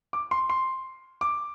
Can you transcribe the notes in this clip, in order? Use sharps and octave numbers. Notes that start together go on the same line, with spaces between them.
D6
C6
C6
D6